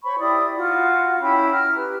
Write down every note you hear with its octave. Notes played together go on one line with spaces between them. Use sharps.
C5 C#5 B5 C#6
E4 G4 D5 D#6
F4 F#4 F#5
C#4 E4 G5 B5
A#5 F6
G4 B4